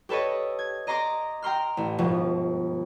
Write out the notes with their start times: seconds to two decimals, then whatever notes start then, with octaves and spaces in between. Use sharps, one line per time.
0.09 G4 A4 B4 C#5 D#5
0.59 G#6
0.87 D#5 A#5 C6 D6 A#6 D7
1.42 G5 A#5 C6 F6
1.77 A1
1.98 G1 G#2 B2 F3